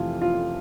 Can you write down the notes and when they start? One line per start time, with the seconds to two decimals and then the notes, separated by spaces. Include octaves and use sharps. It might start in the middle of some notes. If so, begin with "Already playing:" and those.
Already playing: F2 C3 E3 A3 F4
0.22 F4